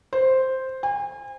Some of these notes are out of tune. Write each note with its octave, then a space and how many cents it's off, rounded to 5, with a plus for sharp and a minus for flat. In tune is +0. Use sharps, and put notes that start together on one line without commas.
C5 +0
G#5 -40